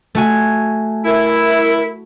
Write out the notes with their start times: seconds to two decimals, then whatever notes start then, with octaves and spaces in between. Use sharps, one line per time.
0.15 A3 F#4 G#5
1.05 E4 A#4